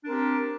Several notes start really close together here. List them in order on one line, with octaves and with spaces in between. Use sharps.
D4 A#4 C4 G4